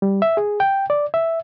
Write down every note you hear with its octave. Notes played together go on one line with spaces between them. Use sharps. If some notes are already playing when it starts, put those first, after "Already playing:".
G3
E5
G#4
G5
D5
E5